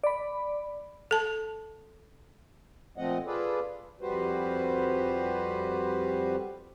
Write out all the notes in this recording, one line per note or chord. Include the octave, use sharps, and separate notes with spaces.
D5 B5
A4 A5
A#2 F3 A3 C4 D#5 F#5
F4 G#4 A4 B4 D5
F2 G3 F#4 G4 B4 C5